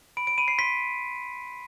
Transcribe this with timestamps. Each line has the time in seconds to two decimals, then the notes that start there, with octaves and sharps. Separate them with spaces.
0.17 B5 D7
0.27 D7
0.38 B5 D#7
0.48 C7
0.58 C6 B6